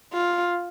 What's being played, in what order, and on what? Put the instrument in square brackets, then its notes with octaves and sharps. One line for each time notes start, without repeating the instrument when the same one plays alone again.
[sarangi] F4